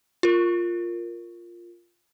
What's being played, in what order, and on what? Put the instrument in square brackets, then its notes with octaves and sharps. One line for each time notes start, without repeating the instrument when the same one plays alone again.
[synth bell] F4 A#4